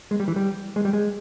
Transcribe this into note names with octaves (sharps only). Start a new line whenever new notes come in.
G#3
G3
E3
G3
G#3
G3
G#3